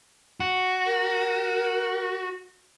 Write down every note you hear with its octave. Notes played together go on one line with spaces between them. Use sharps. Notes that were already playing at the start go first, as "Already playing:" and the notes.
F#4
A#4